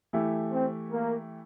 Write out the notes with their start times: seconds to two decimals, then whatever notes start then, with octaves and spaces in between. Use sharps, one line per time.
0.13 E3 A3 E4 G4
0.52 C4
0.91 A#3